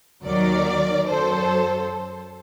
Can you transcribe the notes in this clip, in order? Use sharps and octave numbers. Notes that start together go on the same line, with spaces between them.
D#2 D#3 F#3 A#4 D5
F#2 F#3 A4 C5